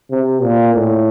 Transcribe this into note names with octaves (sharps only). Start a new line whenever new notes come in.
C3
A#2
A2